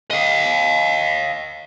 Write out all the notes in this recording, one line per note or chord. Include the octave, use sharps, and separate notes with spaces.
D#5 F5